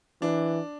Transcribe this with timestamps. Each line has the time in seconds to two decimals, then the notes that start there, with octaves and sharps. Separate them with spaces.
0.22 E3 D4